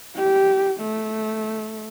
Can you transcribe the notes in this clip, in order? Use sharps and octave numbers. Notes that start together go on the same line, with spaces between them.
G4
A3